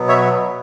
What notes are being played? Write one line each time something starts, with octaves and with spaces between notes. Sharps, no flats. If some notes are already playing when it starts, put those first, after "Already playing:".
Already playing: B2 F#3 B3
C#5 E5